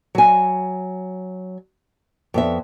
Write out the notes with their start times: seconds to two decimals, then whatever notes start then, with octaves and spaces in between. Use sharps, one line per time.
0.15 F#3 G#5
2.34 F2 B3 E5